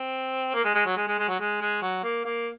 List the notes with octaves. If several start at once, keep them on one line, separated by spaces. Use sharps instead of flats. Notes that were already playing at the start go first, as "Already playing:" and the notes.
Already playing: C4
A#3
G#3
G#3
F#3
G#3
G#3
G#3
F#3
G#3
G#3
F#3
A#3
A#3